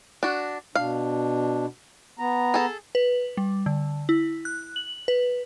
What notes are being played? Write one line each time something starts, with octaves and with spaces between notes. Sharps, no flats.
D4 F#4
B2 D4 F5
B3 A#5
G#4 A4
B4
G3
D3
E4
F#6
F#7
B4